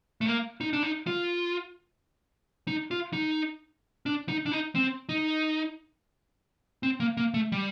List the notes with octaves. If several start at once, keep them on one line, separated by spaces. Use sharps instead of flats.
A3
A#3
D#4
D4
D#4
F4
D#4
F4
D#4
D4
D#4
D4
D#4
C4
D#4
C4
A#3
A#3
A3
G3